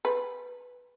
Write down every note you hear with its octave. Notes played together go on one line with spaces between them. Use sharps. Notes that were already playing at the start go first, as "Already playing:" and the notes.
B4